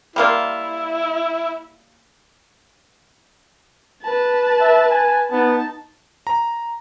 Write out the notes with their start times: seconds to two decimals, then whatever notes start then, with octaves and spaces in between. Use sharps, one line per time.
0.16 G3 A#3 E4 F4
4.03 B4 A5
4.60 E5
4.90 G#5
5.31 B3 D#4 A5
6.27 A#5